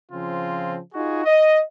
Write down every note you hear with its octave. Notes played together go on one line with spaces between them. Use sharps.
C#3 F3 C4 F4
D#4 F4 F#4 G#4
D#5